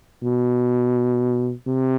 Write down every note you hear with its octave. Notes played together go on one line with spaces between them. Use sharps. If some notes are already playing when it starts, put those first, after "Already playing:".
B2
C3